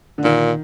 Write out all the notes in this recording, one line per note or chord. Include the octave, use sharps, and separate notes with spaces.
D3
A#2 D#3